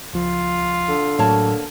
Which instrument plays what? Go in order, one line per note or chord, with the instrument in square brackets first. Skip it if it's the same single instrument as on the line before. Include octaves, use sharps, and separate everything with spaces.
[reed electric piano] C#2 F3 [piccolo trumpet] F4
[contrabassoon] D3
[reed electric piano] A2 F#3 [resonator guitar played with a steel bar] A#3 C#5 A5